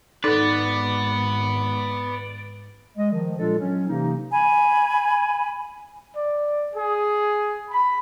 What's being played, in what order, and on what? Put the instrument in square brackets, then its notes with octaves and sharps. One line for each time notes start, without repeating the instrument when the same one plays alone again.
[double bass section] G#1 [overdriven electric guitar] B3 B4 [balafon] D#4 A4 [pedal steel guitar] D5
[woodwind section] G#3 D#5
D#3 F3
A#2 G#3 D4 F4 A4
F#3 C#4
C3 E3 A#3 D#4
[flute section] G#5 B5
[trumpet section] D5
G#4
B5